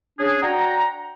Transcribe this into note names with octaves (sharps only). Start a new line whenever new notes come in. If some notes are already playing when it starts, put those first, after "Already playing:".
C#4 D4 G#4
D4 F#4 F#5 G5 A#5